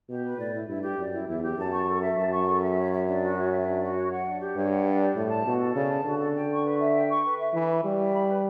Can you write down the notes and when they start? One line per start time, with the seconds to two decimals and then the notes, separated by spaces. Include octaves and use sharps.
0.09 B2 G4
0.23 B4
0.38 A2 D5
0.53 E4
0.68 G2 E4
0.83 G4
0.97 F#2 D5
1.13 E4
1.28 E2 E4
1.43 G4
1.57 F#2 A5
1.72 C#6
1.88 A4
2.02 E5
2.17 F#2 A5
2.32 C#6
2.47 A4
2.62 E5
2.77 C#5
2.92 E5
3.07 D4
3.22 F#4
3.36 C#5
3.51 E5
3.66 D4
3.81 F#4
3.96 C#5
4.11 F#5
4.26 D4
4.41 G4
4.56 G2 C#5
4.71 F#5
4.86 D4
5.00 G4
5.15 A2 D5
5.30 A5
5.45 B2 F#4
5.60 A4
5.75 C#3 D5
5.90 A5
6.05 D3 F#4
6.20 A4
6.35 G5
6.50 C#6
6.64 B4
6.80 E5
6.95 G5
7.10 C#6
7.24 B4
7.39 E5
7.54 E3 B5
7.69 B4
7.84 G3 B4
7.99 E5
8.14 B5
8.29 B4